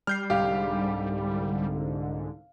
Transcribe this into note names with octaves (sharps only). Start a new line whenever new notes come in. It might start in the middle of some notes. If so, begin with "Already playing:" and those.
G3 F6 G6 C7
C2 G#2 D3 G4 F5